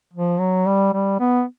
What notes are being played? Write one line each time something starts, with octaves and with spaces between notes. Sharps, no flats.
F3
F#3
G3
G3
B3